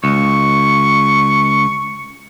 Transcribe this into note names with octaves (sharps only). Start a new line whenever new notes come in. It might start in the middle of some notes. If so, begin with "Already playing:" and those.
C#2 C#6